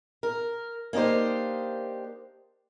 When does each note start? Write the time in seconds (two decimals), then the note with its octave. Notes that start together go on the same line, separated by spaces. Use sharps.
0.23 A#4
0.93 A#3 D4 D#4 G4 C5